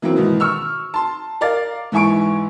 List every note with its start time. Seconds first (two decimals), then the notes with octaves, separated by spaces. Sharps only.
0.02 E3 F#3 A#3 C4
0.16 G#2 B2 D#3 E3
0.40 C#6 E6 F6
0.94 A5 C6
1.41 A#4 D5 F5 D6 A6
1.92 G#2 E3 E5 G#5 C#6 D7